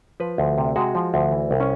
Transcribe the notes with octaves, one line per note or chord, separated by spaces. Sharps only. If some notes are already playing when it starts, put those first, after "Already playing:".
F3 B4
D2
C3
G#3 F#4
F3
D2
E3
C2
C#4